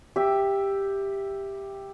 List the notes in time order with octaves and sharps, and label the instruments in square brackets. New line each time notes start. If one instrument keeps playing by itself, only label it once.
[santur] G4 E5